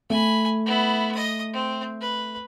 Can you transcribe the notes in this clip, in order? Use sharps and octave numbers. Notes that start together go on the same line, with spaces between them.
A3 G#5 B5
B3 E4
D#5 D#6
C4
B4